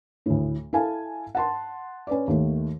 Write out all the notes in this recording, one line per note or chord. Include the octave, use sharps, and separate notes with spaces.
D2 A2
E4 A4 F5 G#5 A5
F#5 A5 C6
C#4 B4 D5
D#2 D#3 A3